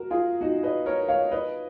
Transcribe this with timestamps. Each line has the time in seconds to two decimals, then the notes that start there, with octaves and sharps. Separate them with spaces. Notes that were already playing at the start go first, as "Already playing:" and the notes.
Already playing: F#4 A#4
0.11 F4 G#4
0.41 D#4 F#4
0.63 B4 D#5
0.86 A#4 C#5
1.08 C#5 F5
1.31 B4 D#5